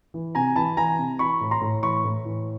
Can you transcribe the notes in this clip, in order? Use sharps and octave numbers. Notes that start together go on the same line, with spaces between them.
E3
C3 G#5 A#5
E3 A5 B5
E3 G#5 A#5
C3
E3 B5 C#6
A2
A#5 C6
A2
E3 B5 C#6
A2
E3